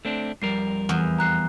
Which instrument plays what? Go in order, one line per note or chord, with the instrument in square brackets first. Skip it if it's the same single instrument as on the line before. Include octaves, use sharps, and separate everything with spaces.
[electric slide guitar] A3 C4 D4
[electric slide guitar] F2 G3 A#4 [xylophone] C7
[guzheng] E2
[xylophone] A#5 F#6 C7